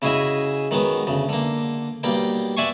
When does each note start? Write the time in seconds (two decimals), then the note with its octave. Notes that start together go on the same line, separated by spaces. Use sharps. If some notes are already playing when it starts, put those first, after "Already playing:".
0.02 C#3 E4 F#4 G#4 D#5 E5
0.71 D#3 F#3 G#3 B3
1.07 D2 C#3
1.29 D3 A#3
2.03 B1 G3 A#3 G5
2.57 D5 E5 F#5 G#5 C6 C#6